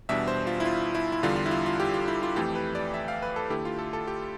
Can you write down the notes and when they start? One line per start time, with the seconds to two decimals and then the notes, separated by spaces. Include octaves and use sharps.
0.09 E2 B2 G3 D4 E5
0.28 C5
0.47 F4
0.60 E4
0.65 F4
0.95 E4
1.12 E4
1.23 E2 D3 G3 D4 F4
1.37 F4
1.46 E4
1.51 F4
1.66 F4
1.80 G4
1.94 F4
2.08 E4
2.23 F4
2.36 F2 E3 A3 G4
2.55 B4
2.75 D5
2.94 E5
3.08 F5
3.22 B4
3.36 A4
3.50 D3 A3 E4 G4
3.65 F4
3.79 A4
3.93 A4
4.07 G4